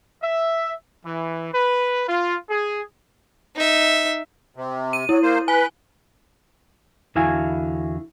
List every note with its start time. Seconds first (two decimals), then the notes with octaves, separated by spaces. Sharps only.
0.22 E5
1.05 E3
1.53 B4
2.08 F4
2.49 G#4
3.56 D#4 E5
4.56 C3
4.93 D#7
5.09 F#3 E4
5.23 A#3 C5
5.48 B4 G#5
7.15 E2 D3 E4 F#4 F5 G#5